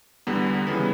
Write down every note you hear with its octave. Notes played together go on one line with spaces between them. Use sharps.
E2 D3 G3 B3
C#3 E3 G3 B3